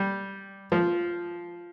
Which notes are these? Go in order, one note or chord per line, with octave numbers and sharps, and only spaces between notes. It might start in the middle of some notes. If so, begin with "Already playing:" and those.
Already playing: G3
F3